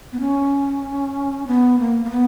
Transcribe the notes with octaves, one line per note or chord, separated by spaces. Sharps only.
B3
C#4
B3
A#3
A#3
B3